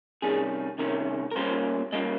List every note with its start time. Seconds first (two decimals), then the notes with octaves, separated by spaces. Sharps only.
0.22 C3 D#3 G3 C#4 G#4
0.78 C3 D#3 G3 C#4 A#4
1.31 A#4
1.36 A#2 G3 A#3 C#4 C5
1.92 A#2 G3 A#3 C#4 D#5